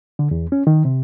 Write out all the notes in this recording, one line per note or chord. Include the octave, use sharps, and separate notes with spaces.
D3
E2
C#4
D#3
C3